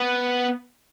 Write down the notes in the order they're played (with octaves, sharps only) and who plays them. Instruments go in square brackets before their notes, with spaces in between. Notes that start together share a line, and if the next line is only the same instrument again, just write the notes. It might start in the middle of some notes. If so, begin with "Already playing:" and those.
Already playing: [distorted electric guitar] B3